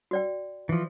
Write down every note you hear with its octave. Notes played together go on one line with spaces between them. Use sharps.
F#4 D5 G5
E3 F3